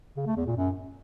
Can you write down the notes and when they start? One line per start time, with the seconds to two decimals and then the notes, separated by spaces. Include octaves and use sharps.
0.16 C#3
0.26 A3
0.36 E2
0.46 A#2
0.56 F#2